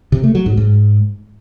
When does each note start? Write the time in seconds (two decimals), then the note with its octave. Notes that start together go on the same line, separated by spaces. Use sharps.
0.12 C3
0.24 A3
0.35 F#3
0.46 G#2
0.57 G#2